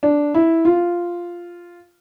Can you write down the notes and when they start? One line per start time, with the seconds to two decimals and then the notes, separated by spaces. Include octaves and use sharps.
0.03 D4
0.34 E4
0.65 F4